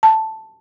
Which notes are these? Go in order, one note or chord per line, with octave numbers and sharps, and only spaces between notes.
A5